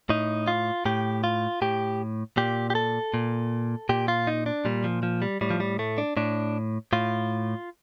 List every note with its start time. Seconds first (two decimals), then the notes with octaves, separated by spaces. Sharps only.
0.09 A2 D#4
0.48 F4
0.85 A2 G4
1.24 F4
1.62 A2 G4
2.37 A#2 G4
2.70 G4
2.75 A4
3.14 A#2
3.89 A#2 G4
4.08 F4
4.27 D#4
4.46 D4
4.65 A#2 G3
4.84 F3
5.03 F3
5.22 G3
5.41 A2 G3
5.50 F3
5.60 G3
5.79 A3
5.98 D4
6.17 A2 D4
6.93 A2 F4